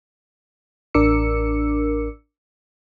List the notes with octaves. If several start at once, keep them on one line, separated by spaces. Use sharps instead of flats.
A1 D4 A#4 D6 E6 C#7